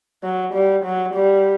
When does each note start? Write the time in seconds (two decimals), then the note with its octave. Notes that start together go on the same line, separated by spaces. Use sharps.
0.23 F#3
0.54 G3
0.85 F#3
1.14 G3